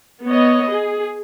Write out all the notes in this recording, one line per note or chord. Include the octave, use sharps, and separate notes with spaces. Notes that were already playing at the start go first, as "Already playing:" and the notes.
B3 C#5 D#5
G#4